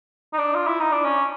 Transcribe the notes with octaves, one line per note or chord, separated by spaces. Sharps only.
D#4
D4
F4
E4
D#4
D4
C#4